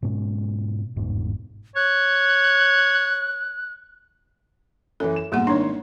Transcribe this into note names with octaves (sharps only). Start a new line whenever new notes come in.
G#2 B2 G#3 C#4
G1 E2 G#2 B2
C#5 F#6
F#2 E3 A4
E7
G#2 B2 G3 A#3 F#5
G#1 D4 D#4 C#5 C6